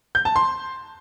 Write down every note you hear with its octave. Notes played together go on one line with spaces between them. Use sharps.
G6
A5
C6